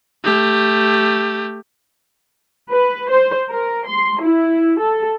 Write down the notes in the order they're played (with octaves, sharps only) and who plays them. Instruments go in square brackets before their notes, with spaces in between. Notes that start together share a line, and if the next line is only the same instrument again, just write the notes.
[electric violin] A3 G4
[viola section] B4
C5
A#4
C6
E4
A4